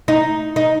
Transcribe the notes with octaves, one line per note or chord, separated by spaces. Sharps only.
D#4
D#4